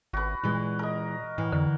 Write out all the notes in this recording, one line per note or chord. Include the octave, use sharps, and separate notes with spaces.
G#1 F#4 B4
A#2 E3 G#3
A#4 D#5
A2 E3
F2 D3